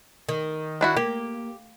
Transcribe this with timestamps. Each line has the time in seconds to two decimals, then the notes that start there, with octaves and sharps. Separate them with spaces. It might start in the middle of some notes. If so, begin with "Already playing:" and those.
0.29 D#3
0.81 D4 E4 F#4
0.96 A#3 G4